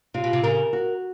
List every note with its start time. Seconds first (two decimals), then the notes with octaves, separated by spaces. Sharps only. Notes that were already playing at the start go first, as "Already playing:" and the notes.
0.14 C3 F4
0.24 B2
0.33 C3
0.43 C#3 A#4
0.73 F#4